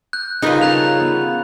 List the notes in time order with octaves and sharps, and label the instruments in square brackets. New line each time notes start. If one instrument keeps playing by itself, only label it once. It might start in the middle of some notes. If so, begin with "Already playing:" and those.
[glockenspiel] F#6 G6
[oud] C#3 G3 F4 [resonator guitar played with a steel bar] D#4 A#4 B4
[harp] C#4 A4 [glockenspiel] A#5 F#6 F7
[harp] B3